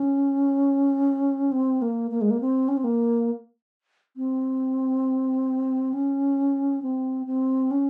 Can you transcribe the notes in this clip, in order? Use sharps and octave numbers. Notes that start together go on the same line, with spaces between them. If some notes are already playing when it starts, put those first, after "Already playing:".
Already playing: C#4
C4
A#3
A#3
G#3
A#3
C4
C#4
C4
A#3
C4
C#4
C4
C4
C#4